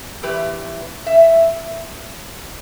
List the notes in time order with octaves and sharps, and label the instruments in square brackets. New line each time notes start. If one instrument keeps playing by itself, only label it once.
[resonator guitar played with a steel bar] E2 E3 G4 B4
E5